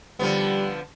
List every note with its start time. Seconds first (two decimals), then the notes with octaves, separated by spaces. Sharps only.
0.19 D3 F3 G3 B3